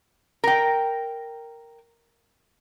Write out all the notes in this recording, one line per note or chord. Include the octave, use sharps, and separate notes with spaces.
A#4 G5